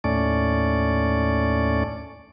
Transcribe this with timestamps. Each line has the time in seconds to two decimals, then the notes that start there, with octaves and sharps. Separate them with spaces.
0.04 D#2 A2 A3 C#4 D5